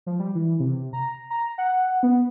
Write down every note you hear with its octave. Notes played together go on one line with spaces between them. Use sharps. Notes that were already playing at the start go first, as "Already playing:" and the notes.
F3
G3
E3
C3
A#5
A#5
F#5
B3